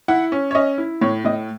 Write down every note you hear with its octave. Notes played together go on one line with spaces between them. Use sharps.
E4 F#5
C#4
C#5
C#4 D#5
E4
A2 C#5
A2 D#5